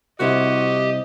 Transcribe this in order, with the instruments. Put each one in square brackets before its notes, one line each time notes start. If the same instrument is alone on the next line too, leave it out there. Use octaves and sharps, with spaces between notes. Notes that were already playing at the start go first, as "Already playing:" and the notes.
[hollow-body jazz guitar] C2 C3 E4 [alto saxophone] F#4 [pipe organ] G4 [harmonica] D#5